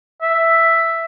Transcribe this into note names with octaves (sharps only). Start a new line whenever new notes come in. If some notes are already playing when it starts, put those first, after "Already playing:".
E5